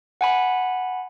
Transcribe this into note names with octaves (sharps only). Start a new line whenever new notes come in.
F#5 G#5 B5